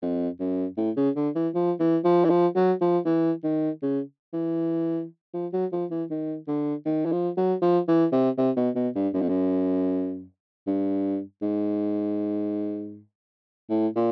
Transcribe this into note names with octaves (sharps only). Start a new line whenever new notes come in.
F2
F#2
A2
C#3
D3
E3
F3
E3
F3
E3
F3
F#3
F3
E3
D#3
C#3
E3
F3
F#3
F3
E3
D#3
D3
D#3
E3
F3
F#3
F3
E3
C3
C3
B2
B2
G2
F#2
F2
F#2
G2
G#2
A2
A#2